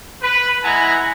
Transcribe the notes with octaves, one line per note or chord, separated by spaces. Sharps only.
B4
G#3 E4 F#5 G#5 A#5